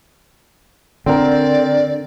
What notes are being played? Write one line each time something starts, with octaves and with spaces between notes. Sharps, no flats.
D3 C4 A#4 D5